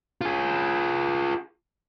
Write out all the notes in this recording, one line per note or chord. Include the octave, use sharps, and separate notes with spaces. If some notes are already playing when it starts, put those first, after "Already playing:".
F4 G#4